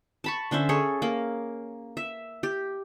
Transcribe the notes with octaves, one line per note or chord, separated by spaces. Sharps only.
A5 B5 C#6
D3 C#4 C5 E5
G#4 A4 C#5
A#3
E5
G4